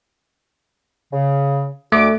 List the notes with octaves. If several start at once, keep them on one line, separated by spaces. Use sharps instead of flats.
C#3
D2 A3 D6